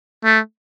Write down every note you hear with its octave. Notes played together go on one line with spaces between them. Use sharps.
A3